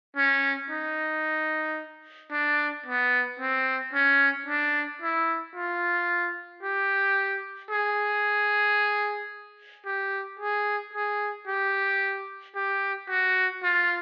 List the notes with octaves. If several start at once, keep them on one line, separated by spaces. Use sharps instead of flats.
C#4
D#4
D4
B3
C4
C#4
D4
E4
F4
G4
G#4
G4
G#4
G#4
G4
G4
F#4
F4